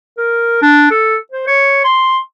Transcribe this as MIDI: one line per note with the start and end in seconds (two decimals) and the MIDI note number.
0.18 0.61 70
0.62 0.87 62
0.91 1.17 69
1.32 1.46 72
1.47 1.80 73
1.84 2.18 84